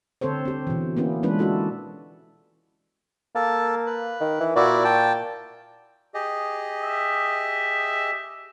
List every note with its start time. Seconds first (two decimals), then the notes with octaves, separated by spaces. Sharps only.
0.21 D3 C4 A4 C5 C#5
0.45 C4 G4
0.67 B2 E3
0.97 A#3 B3 C#4 E4
1.23 E3 G#3 C#4 D4 F4 B4
1.39 D4 E4 F#4 A4
3.35 A#3 A4 A5
3.87 B4
4.21 D#3
4.40 E3
4.56 A#2 E4 F#4 D5
4.84 G5 A5
6.14 G4 G#4 D#5
6.82 E5